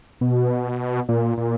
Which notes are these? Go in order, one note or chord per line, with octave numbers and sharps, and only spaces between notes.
B2
A#2
A#2